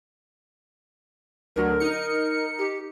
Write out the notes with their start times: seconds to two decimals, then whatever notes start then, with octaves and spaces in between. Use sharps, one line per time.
1.56 D2 D3 F#3 A#4
1.80 D#4 C#7
2.59 G4